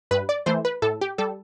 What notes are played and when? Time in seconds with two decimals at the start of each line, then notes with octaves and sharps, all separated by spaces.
0.11 G2 B4
0.29 D5
0.46 E3 A3 C5
0.65 B4
0.82 A2 A4
1.01 G4
1.18 G3 A4